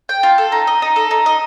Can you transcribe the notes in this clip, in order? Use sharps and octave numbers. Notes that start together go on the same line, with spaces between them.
G5
F4
A4
D#4
D#5
D#4
A4
D#4
D#5